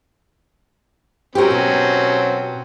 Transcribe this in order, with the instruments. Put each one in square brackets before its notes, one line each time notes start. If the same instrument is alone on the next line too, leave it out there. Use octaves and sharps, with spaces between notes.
[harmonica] F#3 C4 C#4 [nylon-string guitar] G4 A#4
[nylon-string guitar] B2